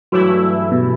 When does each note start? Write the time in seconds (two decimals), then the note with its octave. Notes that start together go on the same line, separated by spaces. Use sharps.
0.12 G2 E3 F#3 A3 E4
0.72 B2